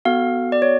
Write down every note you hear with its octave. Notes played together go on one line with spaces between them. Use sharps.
B3 F#4 A4 F5
D5
C#5